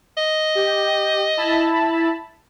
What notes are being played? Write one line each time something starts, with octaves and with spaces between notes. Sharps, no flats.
D#5
G4
E4 A5 B5